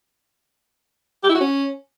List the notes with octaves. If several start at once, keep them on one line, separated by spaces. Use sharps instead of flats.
G4
E4
F#4
C#4